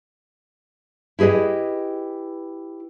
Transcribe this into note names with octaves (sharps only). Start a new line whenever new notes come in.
E4 G4 G#4 B4 D#5